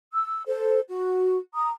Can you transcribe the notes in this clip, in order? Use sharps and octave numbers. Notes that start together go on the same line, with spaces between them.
E6
A4 C5
F#4
A#5 D#6